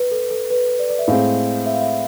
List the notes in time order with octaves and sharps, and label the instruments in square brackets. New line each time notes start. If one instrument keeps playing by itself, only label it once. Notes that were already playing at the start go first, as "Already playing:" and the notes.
Already playing: [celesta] B4
A4
A4
B4
D5
D5
E5
[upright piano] A2 G#3 C4 [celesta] F5
[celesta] E5
F5
E5